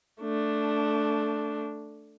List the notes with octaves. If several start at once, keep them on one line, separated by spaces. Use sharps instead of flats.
A3 D4